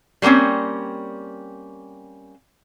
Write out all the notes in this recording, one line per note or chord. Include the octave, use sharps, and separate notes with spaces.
G3 A3 A#3 C4 C#4